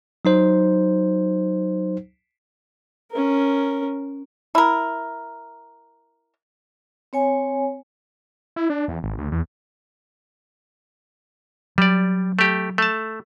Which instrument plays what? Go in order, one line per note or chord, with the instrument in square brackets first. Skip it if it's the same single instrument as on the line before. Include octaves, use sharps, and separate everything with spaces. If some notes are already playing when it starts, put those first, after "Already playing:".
[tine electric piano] F#3 D#4 C5
[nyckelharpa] C#4 A#4
[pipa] E4 A#4
[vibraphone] C4 C#5 G#5
[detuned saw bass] E4
D4
E2
G#1
D2
E2
[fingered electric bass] F#3 [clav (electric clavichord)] G3 D5
[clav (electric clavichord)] A3 G4
A3 A5